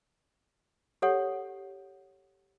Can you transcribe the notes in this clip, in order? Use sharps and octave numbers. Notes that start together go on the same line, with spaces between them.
G4 A4 C#5 F#5